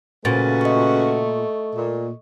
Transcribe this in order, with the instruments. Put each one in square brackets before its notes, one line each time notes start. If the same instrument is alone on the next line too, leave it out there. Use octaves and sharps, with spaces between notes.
[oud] A#2 [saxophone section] C#3 F#4 B4 [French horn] A3 [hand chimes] A6
[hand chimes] D#5 C#6
[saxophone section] A#2